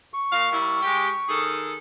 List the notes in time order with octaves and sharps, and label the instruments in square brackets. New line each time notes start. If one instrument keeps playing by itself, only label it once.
[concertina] C#6
[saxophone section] A#2 F5
G3 A#3 E4
G#3 G4
D#3 G#4 A4